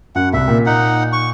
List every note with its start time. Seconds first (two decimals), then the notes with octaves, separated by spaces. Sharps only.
0.15 F#2 F#5
0.33 C2 E5
0.48 A#2
0.66 D#4 F#5
1.13 C#6